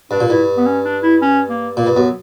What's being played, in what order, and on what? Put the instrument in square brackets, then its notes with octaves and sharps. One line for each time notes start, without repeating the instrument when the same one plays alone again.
[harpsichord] G2 [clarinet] D4
[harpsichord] A#2
[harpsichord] G2 [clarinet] E4
[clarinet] B3
C#4
D4
E4
C#4
A#3
[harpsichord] A#2 [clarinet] A#3
[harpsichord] G2
[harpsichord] F#2 [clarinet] B3